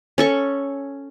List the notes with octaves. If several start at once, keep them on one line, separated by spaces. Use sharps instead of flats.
C#4 A4 C#6